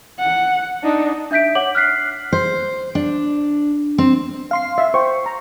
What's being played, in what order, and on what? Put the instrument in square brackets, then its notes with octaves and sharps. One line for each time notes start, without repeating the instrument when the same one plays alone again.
[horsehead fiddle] F#5
D4 D#4
[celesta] D4 E5 G6 B6 D7
C#5 F#5 D6 F#7
F6 F#6 B6 C7
[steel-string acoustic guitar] C5
D4
C4
[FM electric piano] F5 C6 C7
[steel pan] E5
[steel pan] C5 G5 [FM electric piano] C#6
[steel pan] A#5